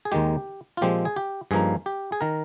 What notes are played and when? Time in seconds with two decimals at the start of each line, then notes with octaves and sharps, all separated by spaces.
0.05 G#4
0.12 D#2 D#3 G#3 G4
0.77 F4
0.81 A#2 F3 G#3 C4 G4
1.05 G#4
1.16 G4
1.51 G2 F3 A#3 D#4 G#4
1.86 G4
2.12 G#4
2.21 D#3 A#4